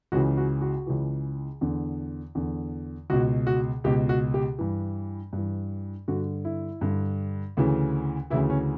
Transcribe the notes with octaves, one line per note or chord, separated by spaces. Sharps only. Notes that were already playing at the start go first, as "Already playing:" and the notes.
C#2 C#3 E3 F#4
F#4
F#4
C#2 C#3 E3
E2 D3
E2 D3
C#2 B2 F#4
F#4
C#2 B2 G4
F#4
G4
G2 E3
G2 E3
G2 D3 F#4
E4
G2 D3
D2 C#3 E3
D2 C#3 E3 E4
C#4